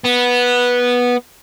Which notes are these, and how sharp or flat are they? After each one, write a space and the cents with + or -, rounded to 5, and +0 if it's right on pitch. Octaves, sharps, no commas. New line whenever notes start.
B3 -10